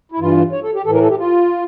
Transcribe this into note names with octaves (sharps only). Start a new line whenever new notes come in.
E4
G2 E3 F4
C#5
A4
G4
A2 E3 A4
A#4
A4
G4
F4